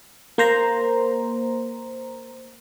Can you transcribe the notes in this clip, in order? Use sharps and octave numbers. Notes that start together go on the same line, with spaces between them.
A#3 C5 A#5